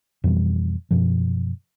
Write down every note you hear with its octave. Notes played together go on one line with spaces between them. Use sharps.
F2 B2 E3 G3
F#2 B2 F3